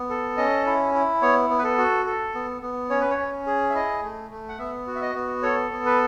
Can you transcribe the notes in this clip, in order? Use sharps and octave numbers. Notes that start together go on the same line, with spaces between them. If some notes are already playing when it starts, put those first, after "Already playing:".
Already playing: B3
A4
C#4 D#5
E4
E4
B3 C#5
B3
B4
A4
F#4
A4
B3
B3
C#4 C#5
B4
C#5
C#4
G#4
E5
E4 D#5
A3
A3
F#5
B3 E5
F#4
E5
D#5
B3
A4 C#5
B3
B4